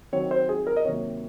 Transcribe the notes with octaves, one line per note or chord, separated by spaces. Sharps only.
D#3 F#3 C4 C#5
C5
G#4
A#4
D#5
C3 D#3 F#3 A#3 C#5